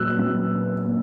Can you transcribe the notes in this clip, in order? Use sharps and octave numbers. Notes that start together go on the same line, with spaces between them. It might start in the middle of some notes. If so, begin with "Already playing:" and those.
Already playing: A#2 F#3 E6 F#6
A#2 F#3
A#2